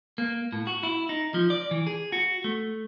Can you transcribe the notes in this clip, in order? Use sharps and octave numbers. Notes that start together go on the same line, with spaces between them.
A#3
A2
F#4
E4
D#4
F3
D5
E3
G#4
F#4
A3